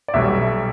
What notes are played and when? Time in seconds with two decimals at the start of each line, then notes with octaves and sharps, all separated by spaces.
0.08 D5
0.14 B1 B2 G3 E5